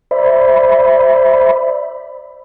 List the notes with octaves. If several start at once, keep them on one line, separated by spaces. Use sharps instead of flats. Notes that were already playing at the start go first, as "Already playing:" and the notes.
C5 D5 E5 B5